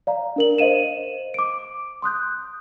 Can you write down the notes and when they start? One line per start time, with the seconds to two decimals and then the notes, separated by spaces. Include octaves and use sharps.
0.07 D5 F5 A#5
0.36 D4 A#4 F#7
0.58 C5 D#5 F5 D#7 E7
1.34 D6 D7
2.02 C6 D#6 F#6 G6